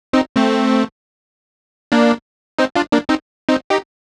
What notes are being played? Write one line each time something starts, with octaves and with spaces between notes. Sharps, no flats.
C4 D#4
A3 C4
A#3 D4
C4 D#4
D4 F4
A#3 D4
C4 D#4
C4 D#4
D#4 G4